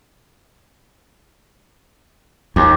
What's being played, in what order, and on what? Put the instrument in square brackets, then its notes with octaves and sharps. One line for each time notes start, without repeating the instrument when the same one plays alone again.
[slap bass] D#2 [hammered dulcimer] G4